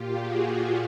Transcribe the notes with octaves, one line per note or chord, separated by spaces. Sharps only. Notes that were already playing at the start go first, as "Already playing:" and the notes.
Already playing: A#2 F4 G4
F#4 G#4
F4 G4